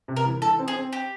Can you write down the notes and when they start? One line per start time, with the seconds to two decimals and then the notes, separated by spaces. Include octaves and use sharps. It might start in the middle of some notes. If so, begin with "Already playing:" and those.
0.08 C3
0.16 A#4
0.25 E3
0.42 E3 A4
0.59 C4
0.68 G#4
0.76 C4
0.93 G4